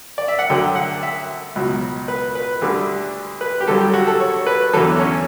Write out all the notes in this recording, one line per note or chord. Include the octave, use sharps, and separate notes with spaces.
D5
E5
F#5
D2 D3 F#3 G5
F#5
E5
C#2 B2 F#3
B4
B4
D2 D3 G3
B4
G4
G2 D3 F#3 A4
G4
F#4
A4
C#5
B4
E2 D3 F#3 A4
C#4